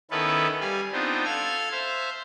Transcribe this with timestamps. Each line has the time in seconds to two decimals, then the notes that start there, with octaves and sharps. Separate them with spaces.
0.11 D#3 B3 C#4 E4 A4 B4
0.60 G3 F5 G#5
0.92 B3 C4 D4 D#4 F4
1.25 A4 F5 F6 G#6
1.72 C5 E5 F5